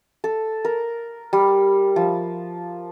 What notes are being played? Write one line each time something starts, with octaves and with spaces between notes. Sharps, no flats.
A4
A#4
G3
F3